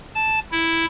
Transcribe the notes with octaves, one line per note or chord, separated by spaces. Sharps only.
A5
E4